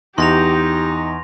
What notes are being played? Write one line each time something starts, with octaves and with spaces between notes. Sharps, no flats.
E2 D#4 G4 C6 A#6 F7